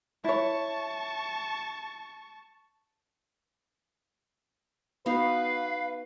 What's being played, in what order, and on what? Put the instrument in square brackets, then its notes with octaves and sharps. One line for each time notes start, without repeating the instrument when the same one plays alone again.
[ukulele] E4 C#5 [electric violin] A5 C#6
[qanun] B3 D#4 F#4 [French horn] B4 [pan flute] F5